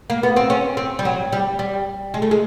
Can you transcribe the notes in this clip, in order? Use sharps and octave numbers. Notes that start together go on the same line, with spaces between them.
A#3
B3
C4
C#4
C4
G3
F#3
G3
G3
G#3
A3
G#3